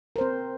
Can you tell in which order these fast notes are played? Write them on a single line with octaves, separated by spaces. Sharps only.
A#4 C5 C4